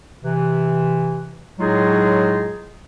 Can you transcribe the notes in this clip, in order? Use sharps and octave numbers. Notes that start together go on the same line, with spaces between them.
C3 E3
A2 F#3 G#3 D#4 F4 G#4